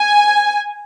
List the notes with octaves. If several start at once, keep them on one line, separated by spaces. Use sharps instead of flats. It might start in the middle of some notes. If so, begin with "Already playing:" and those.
Already playing: G#5